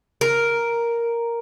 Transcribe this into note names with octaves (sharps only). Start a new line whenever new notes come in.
A#4